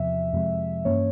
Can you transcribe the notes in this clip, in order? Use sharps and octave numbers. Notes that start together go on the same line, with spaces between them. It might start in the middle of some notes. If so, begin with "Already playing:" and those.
Already playing: E2 C3 F3 E5
F2 C3 F3 G#3
G2 E3 A#3 C#4 C#5